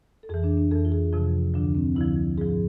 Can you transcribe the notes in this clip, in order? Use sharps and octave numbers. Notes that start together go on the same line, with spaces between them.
A4
F2 E3 G#4
D4
D4
F2 E3 A4
F4
G#4
F2 C3 F3 F4
D2 D3 F3 D4
C4
D2 D3 F3 E4
G#2 F3 G#4